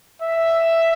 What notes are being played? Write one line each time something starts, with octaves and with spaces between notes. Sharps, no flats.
E5